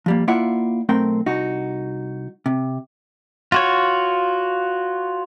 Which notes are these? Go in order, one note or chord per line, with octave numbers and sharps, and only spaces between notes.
F3 G3 A#3
A#3 E4 F4 D5 E5 F#5
B1 A3 C4 A#4 G5
C2 D#4 F#4
C3
F4 F#4 C#5